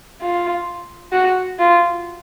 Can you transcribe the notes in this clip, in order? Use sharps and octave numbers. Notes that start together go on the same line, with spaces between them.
F4
F#4
F4